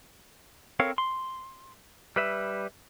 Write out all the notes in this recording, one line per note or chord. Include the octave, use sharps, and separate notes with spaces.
C4 A4 A#4 C#5 F5
C6
G3 B4 E5